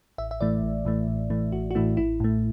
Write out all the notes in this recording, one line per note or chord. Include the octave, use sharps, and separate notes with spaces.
A1 E5
E5
A2 E3 A3 D5
A1
A2 E3 A3
A1
A2 E3 A3
A1 F#4
F#4
A2 E3 A3 E4
A1 E4
A2 A3